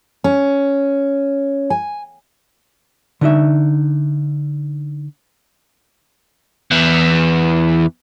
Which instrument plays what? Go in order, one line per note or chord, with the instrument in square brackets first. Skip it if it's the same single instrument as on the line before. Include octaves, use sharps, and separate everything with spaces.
[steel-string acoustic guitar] C#4
G#5
[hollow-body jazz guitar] D3 D#4 E5
[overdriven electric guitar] E2 E3